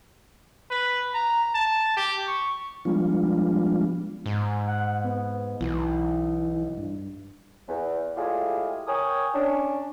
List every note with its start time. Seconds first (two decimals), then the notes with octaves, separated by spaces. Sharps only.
0.70 B4
1.14 A#5
1.55 A5
1.97 G4
2.28 C#6
2.85 F3 G3 G#3 B3 D4 F4
4.26 G#2
4.68 F#5
5.04 B3
5.61 B1 E3
6.77 G2
7.68 E2
8.16 A2 G#3 E4 F4 G4 G#4
8.88 A#4 C#5 G5 G#5 D#6
9.34 C#4 D4